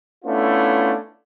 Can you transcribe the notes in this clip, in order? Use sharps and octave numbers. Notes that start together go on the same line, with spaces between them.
A3 B3 C#4 D4 E4 F4